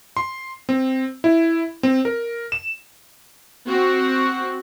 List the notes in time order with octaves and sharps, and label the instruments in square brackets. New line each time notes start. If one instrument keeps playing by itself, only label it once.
[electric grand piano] C6
C4
E4
C4
A#4
E7
[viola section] C4 F#4